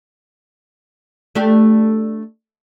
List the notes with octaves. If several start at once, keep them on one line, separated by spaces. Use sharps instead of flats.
A3 D4 G4